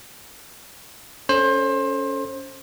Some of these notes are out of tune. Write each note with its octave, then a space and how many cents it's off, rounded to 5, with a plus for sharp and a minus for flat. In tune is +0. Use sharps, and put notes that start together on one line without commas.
C#4 +15 A4 +0 C5 +25